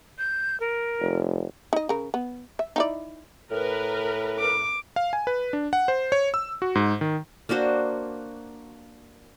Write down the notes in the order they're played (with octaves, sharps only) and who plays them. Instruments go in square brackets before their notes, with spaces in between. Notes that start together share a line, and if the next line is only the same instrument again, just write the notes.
[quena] G6
A#4
[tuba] F1
[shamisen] D#4 D#5
C#3 A#4
B3
E5
D#4 E4 D5
[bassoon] A2 [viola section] A#4 B4
[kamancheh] D6
[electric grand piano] F5
G#5
B4
D4
F#5
C5
C#5
E6
F#4
G#2
D#3
[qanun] A#3 D4 F#4 C5